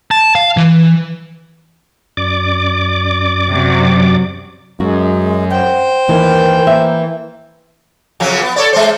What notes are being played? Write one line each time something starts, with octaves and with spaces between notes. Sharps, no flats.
A5
F5
E3
F#2 D5 D6
C3 F#3
F#2 G#3 F#4
C5 F#5 G5
D#2 E3 A#4
A#3 E5
F2 C#3 F#3
B3
A4 C#5 D5
G#3 C5